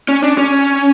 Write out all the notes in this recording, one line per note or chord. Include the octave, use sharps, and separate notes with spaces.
C#4
D4
C#4